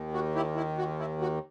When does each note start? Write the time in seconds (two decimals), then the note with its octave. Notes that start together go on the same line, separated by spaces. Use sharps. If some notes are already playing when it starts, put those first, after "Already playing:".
Already playing: D#2 D#3
0.14 F#4
0.35 E4 G4
0.56 E4
0.78 F#4
0.99 E4
1.21 F#4